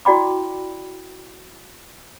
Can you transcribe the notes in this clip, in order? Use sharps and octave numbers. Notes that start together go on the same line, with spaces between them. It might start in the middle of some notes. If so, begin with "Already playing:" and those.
E4 F#4 D5 G5 B5 D6